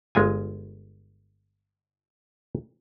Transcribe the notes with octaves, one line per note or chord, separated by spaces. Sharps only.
G1 G#3 F4 G#5